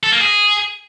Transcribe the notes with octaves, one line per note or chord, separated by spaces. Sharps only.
A4
A#3
G#4